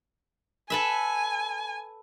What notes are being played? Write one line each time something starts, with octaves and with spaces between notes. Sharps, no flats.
A4 B4 E5 G#5